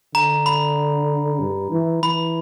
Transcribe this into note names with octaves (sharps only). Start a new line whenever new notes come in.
D3 A#5
B5
G2
E3
E3 B5